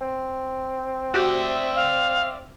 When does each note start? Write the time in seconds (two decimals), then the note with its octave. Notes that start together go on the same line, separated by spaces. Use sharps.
0.01 C4
1.14 F#4 G4 D5 E5
1.75 F5